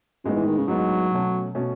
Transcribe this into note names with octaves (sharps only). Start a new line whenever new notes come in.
F#2 A2 G#3 B3 D#4
E3
D#3
C#3
A2 F#3 G#3 B3 D#4
B2 A3 C#4
B2 A3 C#4